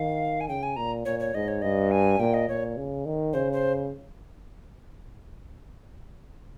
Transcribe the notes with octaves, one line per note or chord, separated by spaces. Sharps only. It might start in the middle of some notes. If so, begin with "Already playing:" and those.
Already playing: D#3 F5
G#5
C#3 G5
G#5
A#2 A#5
A#2 C#5
C#5
G#2 D#5
C#5
G2 D#5
G#5
A#2 G5
D#5
A#2 C#5
C#3
D#3
C#3 C5
C5